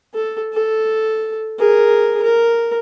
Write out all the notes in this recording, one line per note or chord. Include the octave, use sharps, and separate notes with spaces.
A4
A4
G#4 A#4
A#4